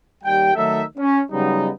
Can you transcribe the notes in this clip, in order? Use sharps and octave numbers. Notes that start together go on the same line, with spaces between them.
D#2 G3 G4 G5
D#3 F#3 A3 D#4 A4 E5
C#4
C#3 F#3 G3 B3 D#4